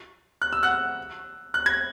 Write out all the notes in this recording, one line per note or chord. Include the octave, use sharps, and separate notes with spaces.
F#6
E6
F#5 F#6
F#6
G#6